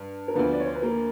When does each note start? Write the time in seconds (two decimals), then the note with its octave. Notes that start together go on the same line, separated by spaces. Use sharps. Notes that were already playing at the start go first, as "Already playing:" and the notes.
Already playing: G2
0.28 A#4
0.34 D2 D3 F3 B3 B4
0.52 D5
0.60 C#5
0.67 C5
0.75 B4
0.82 A#3 A#4